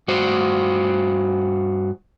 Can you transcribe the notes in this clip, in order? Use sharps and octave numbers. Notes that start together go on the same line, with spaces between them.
G2 F#4 C5